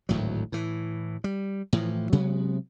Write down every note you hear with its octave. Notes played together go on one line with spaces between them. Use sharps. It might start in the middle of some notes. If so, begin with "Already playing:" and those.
G#1 D2 A2 F#3
A2 E3
G3
A2 E3 F3
C3 F#3 G#3 B3